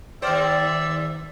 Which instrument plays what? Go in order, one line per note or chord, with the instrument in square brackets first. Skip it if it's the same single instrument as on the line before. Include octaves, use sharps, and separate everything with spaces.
[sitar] D#2 C5 [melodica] D5 [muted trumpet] E5 [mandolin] G5 D6 F6